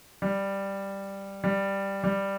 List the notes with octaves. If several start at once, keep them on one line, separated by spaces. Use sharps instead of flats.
G3
G3
G3